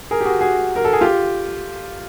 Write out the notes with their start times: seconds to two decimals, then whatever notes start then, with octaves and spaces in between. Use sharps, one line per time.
0.11 G#4 A#4
0.21 G4
0.26 F#4 G#4
0.41 F#4 G#4
0.76 A#4
0.85 A4
0.93 G#4
1.01 F4 G4